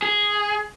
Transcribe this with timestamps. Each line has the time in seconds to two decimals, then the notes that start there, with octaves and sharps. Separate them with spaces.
0.02 G#4